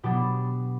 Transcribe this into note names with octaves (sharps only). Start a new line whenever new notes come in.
B2 F#3 B3 D4 G4